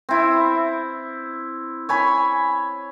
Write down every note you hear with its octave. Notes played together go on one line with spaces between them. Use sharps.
C4 E4
C#5 G#5 B5